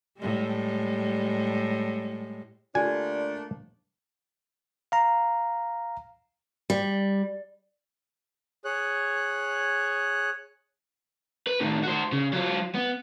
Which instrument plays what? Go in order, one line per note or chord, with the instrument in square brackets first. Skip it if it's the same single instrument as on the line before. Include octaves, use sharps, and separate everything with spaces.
[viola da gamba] A2 G3 G#3
[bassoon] D3 [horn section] A3 A#3 D4 [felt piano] F4 G4 [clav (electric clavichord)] G#5
[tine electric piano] F5 A#5
[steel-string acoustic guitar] G3
[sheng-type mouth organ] G#4 C#5 F#6
[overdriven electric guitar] B4
A2 D#3
F#4 C5
C#3
F#3 F4
B3